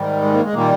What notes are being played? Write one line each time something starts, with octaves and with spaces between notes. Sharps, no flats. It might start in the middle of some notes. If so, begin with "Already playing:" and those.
Already playing: G#2 D#3 G3
G#3
A#3
G#3
A#2 D#3 G3 A#3